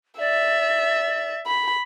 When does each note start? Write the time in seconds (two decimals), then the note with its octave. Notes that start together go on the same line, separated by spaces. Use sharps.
0.19 D5 E5
1.46 B5